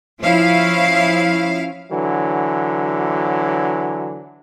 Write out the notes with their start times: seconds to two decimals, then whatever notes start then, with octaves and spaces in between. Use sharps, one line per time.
0.20 F3 C#4 E4 F5
1.91 D3 E3 F#3